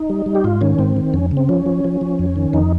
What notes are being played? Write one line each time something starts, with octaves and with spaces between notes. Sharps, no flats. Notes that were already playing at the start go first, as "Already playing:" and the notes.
Already playing: D#4
G3
G3
G4
G#2 F4
D#3 C#4
G#2 C4
D#3
F2 C#4
C#3
C4
F3 C#4
F3
F3
F3
F2
D#3
F2 D#4